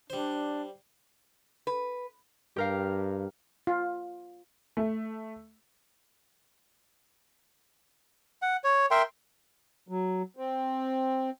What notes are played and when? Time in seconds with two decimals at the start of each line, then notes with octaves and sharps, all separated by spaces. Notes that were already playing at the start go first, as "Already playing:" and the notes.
0.10 G3 D4 C5
1.67 B4
2.56 G2 G4 A#4 F5
3.67 F4
4.77 A3
8.42 F#5
8.64 C#5
8.91 A#4 E5 G5 C6
9.88 F#3
10.37 C4